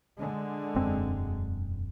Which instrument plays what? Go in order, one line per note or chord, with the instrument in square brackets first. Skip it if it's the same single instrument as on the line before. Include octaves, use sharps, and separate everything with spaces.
[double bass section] D3 G#3
[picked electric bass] E1 F#2 C4